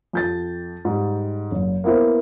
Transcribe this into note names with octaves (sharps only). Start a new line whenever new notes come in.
F2 G6 A6
G#2 G3
F#1
A#3 B3 E4 B4 C5